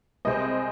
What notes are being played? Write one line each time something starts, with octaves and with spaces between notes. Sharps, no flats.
C2 C3 G#3 C4 D#5